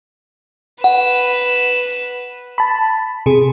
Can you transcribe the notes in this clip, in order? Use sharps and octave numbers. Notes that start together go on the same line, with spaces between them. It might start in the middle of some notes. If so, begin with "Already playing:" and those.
B4 F#5 E7
A5 B5
C3 G#4